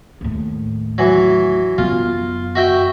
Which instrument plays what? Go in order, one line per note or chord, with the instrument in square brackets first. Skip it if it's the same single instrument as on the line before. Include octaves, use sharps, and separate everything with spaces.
[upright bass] D#2 A2
[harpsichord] E3 F#3
[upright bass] F#2 B3 [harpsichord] F4
[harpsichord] F#4 E5 G5